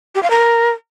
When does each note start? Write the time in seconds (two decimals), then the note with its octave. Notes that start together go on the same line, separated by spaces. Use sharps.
0.15 G4
0.23 F5
0.30 A#4